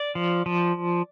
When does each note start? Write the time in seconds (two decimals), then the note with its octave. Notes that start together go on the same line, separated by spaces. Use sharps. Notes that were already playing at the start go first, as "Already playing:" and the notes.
Already playing: D5
0.15 F3
0.46 F3